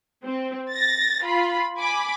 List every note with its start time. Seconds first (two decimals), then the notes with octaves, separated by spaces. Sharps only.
0.23 C4
0.71 A6 A#6
1.23 F4 B5
1.78 G#5 B5 D6